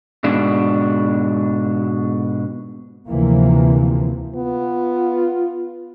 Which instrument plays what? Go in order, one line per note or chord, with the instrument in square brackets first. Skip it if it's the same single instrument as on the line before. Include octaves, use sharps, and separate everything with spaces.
[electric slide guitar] G#2 B2 D4
[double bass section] D2 C3 E3 F3 A#3
[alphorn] B3 [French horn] F4